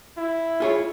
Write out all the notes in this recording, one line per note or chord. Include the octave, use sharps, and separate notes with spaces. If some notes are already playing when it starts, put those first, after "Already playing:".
E4
F4 G#4 C#5